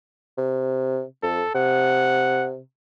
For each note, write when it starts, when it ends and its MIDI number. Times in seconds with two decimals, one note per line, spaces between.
0.37 1.03 48
1.23 1.43 41
1.23 1.53 69
1.55 2.59 48
1.55 2.47 78